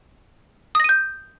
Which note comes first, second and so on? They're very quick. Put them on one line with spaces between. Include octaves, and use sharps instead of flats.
D#6 A#6 D#7 G6